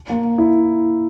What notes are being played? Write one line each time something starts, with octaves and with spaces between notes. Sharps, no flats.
A#3
E4